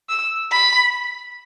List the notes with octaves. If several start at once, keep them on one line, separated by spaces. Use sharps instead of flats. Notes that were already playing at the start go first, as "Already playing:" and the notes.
E6
B5